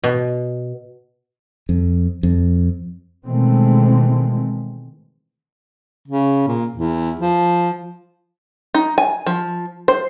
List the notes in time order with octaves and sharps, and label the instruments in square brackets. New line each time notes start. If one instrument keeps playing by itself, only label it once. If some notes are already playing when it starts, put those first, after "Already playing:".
[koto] B2
[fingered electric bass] F2
F2
[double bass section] B2 D#3 E3 G#3 A3 C4
[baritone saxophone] C#3
A#2
E2
F3
[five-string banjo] D#4
G#5
F3
C5